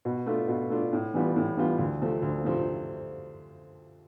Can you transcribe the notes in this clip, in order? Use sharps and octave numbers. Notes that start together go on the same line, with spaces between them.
B2
A3 D4 F4
B2
A3 D4 F4
A2
E3 G3 B3 F4
A2
E3 G3 B3 F4
D2
C3 F3 A3
D2
C3 F3 A3